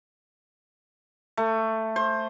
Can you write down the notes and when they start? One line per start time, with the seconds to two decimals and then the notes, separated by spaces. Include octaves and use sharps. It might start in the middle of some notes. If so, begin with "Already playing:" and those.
1.37 A3
1.96 C5